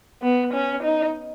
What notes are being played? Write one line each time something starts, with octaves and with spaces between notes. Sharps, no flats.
B3
C#4
D#4